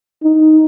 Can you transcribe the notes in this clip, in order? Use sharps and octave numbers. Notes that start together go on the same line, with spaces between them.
D#4